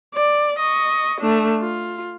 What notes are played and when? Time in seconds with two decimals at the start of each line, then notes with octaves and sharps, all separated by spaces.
0.14 D5
0.59 D#5 C#6
1.20 A3 D4
1.60 F4